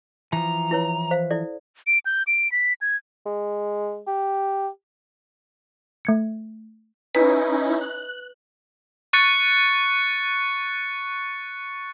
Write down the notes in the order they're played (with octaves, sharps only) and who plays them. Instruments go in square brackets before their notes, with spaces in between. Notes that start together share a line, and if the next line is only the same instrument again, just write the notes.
[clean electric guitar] E3 F3 [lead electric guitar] A#5
[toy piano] E4 B4 C#5
C5 F5
E4 A4 D5
[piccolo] D7
G6
D7
B6
G#6
[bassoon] G#3
G4
[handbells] A3 G#6 C#7
[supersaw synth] C#4 D#4 E4 [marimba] B4
[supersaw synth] F#6
[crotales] C#6 F#6 A6 C#7